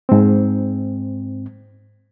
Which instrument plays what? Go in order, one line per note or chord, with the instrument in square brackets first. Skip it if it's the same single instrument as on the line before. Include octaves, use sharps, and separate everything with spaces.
[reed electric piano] G#2 C4